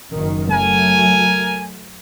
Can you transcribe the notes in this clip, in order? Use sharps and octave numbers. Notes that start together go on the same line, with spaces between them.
F#1 F#2 D#3
F#3 A3 A#4 G#5